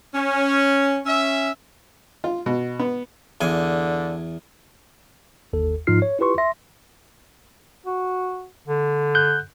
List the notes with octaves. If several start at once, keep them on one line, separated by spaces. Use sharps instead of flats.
C#4
C#4 E5
F4
B2
B3
E2 D3 G#5
G1 D#2 A4
G#2 F3 D#4 F4 F6 C7
C#5
E4 F4 G4 B4 C6 C#6
E5 C6 A#6
F#4
D3
F#6 G6